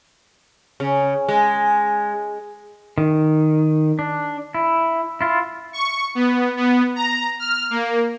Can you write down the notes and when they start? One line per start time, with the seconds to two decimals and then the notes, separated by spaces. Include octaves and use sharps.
0.80 C#3
1.29 G#3
2.98 D#3
3.99 D4
4.55 E4
5.21 E4 F4
5.73 C#6
6.15 B3
6.57 B3
6.96 A#5
7.39 F6
7.70 A#3